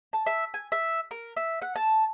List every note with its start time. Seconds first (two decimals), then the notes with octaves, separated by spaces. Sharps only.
0.13 A5
0.27 E5
0.54 G#5
0.72 E5
1.11 A#4
1.37 E5
1.62 F#5
1.76 A5